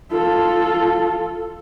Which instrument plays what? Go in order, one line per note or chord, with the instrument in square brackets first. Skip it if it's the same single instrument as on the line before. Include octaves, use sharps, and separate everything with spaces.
[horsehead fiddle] F4 A4